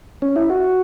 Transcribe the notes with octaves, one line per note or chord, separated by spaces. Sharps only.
C#4
E4
F#4